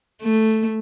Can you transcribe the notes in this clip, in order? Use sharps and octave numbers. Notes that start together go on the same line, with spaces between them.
A3